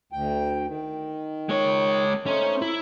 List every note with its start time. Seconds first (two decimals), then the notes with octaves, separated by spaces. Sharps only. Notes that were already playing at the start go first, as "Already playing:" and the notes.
0.12 D2 G5
0.67 D#3
1.49 G#3 C#5
2.26 A3 C#4 D#4 C5
2.62 E4